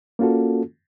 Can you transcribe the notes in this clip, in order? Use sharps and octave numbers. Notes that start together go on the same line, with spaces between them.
A#3 C#4 F4 F#4 A4